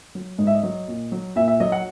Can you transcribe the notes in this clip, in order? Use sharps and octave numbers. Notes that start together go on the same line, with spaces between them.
F#3
G#2 D#5
E5
D#5
F#3
A#2
F#3
A#2 E5
E5
F#3 D#5
F#5